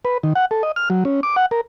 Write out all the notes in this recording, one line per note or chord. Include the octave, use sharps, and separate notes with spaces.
B4
D#3
F#5
A4
D#5
F6
F#3
C#4
D6
F#5
A#4